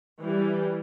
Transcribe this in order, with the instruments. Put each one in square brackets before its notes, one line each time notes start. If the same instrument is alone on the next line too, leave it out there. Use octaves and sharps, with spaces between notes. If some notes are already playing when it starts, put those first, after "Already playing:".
[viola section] E3 G3